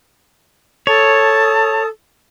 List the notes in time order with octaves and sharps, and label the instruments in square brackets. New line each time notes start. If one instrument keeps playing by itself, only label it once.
[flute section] A4 A5 D#6 [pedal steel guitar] C#5